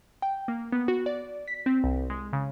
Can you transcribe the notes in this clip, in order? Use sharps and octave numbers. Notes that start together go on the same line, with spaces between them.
G5
A#3
B3
F#4
D5
B6
C4
C2
G#3
C#3